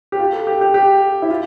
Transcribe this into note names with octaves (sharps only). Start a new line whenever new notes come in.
G4
F4
A4
G4
G4
G4
E4
F4